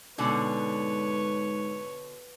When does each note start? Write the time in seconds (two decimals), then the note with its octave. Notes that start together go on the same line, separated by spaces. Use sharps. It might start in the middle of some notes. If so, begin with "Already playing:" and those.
0.18 G#2 B2 D3 B4 C#5 G#5